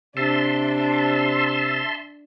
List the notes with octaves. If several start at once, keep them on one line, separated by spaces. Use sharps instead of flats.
C3 D4 E5 A5 C6